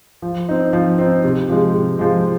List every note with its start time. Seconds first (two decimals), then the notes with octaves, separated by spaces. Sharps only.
0.22 F3
0.49 C4 D#4
0.73 F3
0.98 C4 D#4
1.24 C3
1.49 F3 G#3
1.75 C3
1.99 F3 G#3